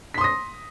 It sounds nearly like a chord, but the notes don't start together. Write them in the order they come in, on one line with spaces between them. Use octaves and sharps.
B6 C6 D#6 A#6